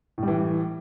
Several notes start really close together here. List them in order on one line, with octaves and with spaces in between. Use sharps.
A2 G3 E3